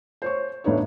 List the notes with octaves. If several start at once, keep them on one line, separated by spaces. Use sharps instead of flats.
C5 C#5 C#6
G1 A2 D4 D#4 B4 C#5